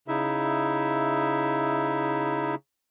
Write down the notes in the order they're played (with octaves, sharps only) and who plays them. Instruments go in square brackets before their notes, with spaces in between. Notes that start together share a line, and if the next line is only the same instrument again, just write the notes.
[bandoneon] C#3 D#4 E4 E5